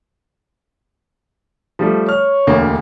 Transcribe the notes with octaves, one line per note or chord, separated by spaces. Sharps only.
F3 G3 A3
C#5 F6
E1 D2 A#3